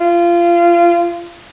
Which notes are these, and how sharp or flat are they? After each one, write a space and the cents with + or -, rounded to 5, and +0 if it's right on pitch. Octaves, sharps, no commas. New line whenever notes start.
F4 -25